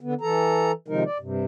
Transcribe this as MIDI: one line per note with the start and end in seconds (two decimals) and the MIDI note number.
0.01 0.14 50
0.01 0.14 59
0.21 0.72 52
0.21 0.72 69
0.21 0.72 82
0.88 1.03 48
0.88 1.03 51
0.88 1.03 53
0.88 1.03 56
0.88 1.03 63
0.88 1.03 70
1.05 1.18 74
1.20 1.45 43
1.20 1.45 48